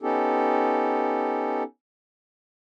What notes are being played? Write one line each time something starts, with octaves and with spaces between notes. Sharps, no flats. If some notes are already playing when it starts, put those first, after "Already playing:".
B3 C#4 D#4 G4 A4